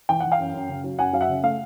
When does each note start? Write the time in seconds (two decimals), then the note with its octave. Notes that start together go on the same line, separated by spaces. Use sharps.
0.09 E3 G5
0.20 E3 F#5
0.32 F5 G5
0.39 F#2
0.54 F#2
0.69 C#3
0.84 F#3
0.99 F#2 F#5 G#5
1.13 F#3 F5
1.21 E5 F#5
1.29 C#3
1.43 A3 F5